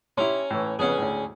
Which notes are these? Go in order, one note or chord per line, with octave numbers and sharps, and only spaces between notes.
C#4 E4 G4 A#5 C6
A2 E3 C#6
F2 C#3 B3 C#4 G#4
D2 A2